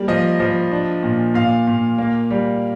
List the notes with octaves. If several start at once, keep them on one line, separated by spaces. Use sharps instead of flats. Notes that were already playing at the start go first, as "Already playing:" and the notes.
Already playing: G3 A#3
F3 D#5
F3
D4
A#2
A#2 F5
A#2
A#3
G3